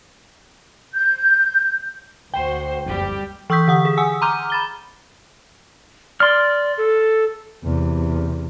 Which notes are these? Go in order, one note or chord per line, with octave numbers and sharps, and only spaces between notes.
G6
D2 F#4 C5 G5
F#1 F2 G3 G4
E3 C#6 D#6 E6 G6 B6
D3 F#5 D#6
G#4
F#5 G#5 D#6 E6
A#5 C6 D6 F6 G6 D#7
B5 A6 G7
D5 C6 F6
A4
E2 C3